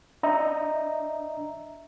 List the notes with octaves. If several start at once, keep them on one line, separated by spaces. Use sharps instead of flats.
D4 D#5 E5 A#5